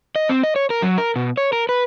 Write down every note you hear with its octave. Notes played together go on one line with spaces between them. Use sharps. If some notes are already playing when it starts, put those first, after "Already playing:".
D#5
C4
D#5
C#5
A#4
F#3
A#4
B2
C#5
A#4
B4